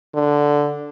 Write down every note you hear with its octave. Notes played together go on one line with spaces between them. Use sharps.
D3